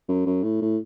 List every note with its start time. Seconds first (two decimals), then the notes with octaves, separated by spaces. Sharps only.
0.08 F#2
0.26 F#2
0.43 A2
0.62 A2